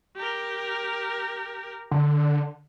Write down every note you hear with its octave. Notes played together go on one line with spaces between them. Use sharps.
G4 A#4
D3